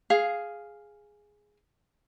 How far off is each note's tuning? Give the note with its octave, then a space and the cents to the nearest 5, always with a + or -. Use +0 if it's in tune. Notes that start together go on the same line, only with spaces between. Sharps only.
G#4 +0 F5 +0